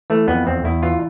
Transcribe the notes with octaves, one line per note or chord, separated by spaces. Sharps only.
E3 A3
F2 B3
E2 C4
E2 E4
E3 F4